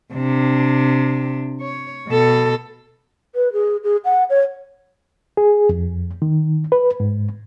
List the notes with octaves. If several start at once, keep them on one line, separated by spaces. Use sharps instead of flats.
C3 D4
C#5
B2 A4
B4
G#4
G#4
F#5
C#5
G#4
F2
D#3
B4
G#2